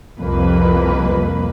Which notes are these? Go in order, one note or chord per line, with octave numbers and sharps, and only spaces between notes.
C2 F2 A#3 B4